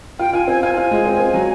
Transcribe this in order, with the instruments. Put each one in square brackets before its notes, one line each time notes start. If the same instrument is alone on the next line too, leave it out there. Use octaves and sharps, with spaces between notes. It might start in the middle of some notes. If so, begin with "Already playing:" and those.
[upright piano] F4 [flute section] G5
[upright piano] F4 [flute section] G#5
[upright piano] C4 [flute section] G#5
[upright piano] F4 [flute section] G#5
[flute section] A5
[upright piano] F4 [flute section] G#5
[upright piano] G#3
C4
C4
F#3